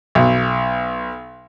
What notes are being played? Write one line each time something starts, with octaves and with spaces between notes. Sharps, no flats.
B1